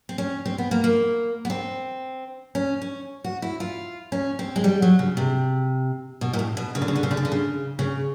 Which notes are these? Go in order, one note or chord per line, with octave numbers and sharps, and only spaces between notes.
C4
C#4
C4
B3
A#3
A#3
B3
C4
C#4
C#4
F#4
E4
F4
C#4
C4
G#3
G3
F#3
C#3
C3
B2
A#2
A2
B2
C#3
D3
C#3
D3
C#3
D3
C#3
D3
C#3
C#3